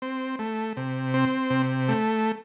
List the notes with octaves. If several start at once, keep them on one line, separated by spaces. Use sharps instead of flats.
C4
A3
C3
C4
C3
A3